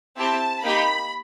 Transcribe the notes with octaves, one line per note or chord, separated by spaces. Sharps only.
C4 E4 G4 A5
A#3 D#4 G4 B5